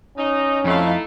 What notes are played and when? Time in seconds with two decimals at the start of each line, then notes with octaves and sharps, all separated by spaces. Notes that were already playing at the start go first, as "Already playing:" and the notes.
0.17 C#4 D#4
0.65 F2 A3 D#4 E4 F5